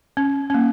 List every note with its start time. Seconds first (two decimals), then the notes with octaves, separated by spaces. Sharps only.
0.17 C#4
0.50 C#4
0.54 A#3